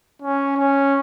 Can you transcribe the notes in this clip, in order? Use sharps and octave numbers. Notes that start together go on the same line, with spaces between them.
C#4
C#4